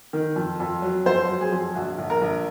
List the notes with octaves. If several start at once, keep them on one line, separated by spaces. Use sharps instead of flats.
D#3
F2
F2
F#3
F2 C5
F#3
G#4
F2
A#1 F#4
A#1
A#4
A#1